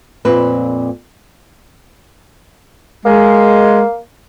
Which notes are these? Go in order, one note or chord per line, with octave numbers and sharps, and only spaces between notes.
F2 A#2 C4 B4
G#3 A#3